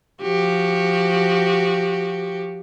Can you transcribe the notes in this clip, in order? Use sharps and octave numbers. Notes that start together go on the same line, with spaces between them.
F3 F#4 G4